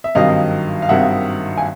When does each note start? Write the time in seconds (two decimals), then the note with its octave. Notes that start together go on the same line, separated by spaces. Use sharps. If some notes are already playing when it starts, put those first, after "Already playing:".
0.04 E5
0.15 G#1 G2 D#3 F#3 D#5 F5
0.82 F5
0.89 G#1 G2 D#3 F#3 E5 F#5
1.57 G#5